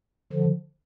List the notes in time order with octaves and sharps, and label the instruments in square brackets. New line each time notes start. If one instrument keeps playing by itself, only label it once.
[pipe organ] D3 F3